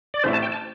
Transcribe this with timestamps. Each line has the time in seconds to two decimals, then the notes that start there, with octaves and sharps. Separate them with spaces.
0.14 D5
0.24 A1 A2 A3 C4 E4 C5
0.33 A5
0.42 G5
0.52 A5